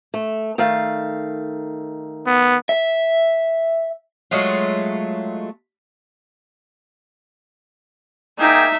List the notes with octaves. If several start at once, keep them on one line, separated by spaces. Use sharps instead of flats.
A3
D#3 A3 F5
B3
E5
F#3 G#3 A3 F4
A#3 D#4 G#4 E5 G5